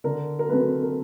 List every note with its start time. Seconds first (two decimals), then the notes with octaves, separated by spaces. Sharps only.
0.04 D3 A#4
0.39 A#4
0.49 F#3 A3 C4 B4
0.83 A#4